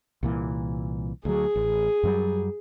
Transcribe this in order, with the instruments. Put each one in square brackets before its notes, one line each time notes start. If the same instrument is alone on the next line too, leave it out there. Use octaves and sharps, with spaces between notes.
[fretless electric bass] C2 A#2 E3
[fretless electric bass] D2 F#3 [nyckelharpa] G#4
[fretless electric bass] A1
F#2 F#3 G3